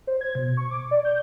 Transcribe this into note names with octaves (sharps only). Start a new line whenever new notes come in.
C5
G#6
B2
C#6
D6
D5
G6